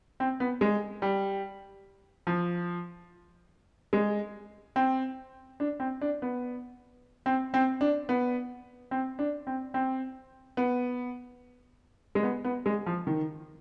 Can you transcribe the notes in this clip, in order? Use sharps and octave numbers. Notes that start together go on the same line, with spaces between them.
C4
B3
G#3
G3
F3
G#3
C4
D4
C4
D4
B3
C4
C4
D4
B3
C4
D4
C4
C4
B3
G#3
B3
B3
G#3
F3
D#3